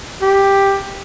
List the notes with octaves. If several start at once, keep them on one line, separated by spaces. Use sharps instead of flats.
G4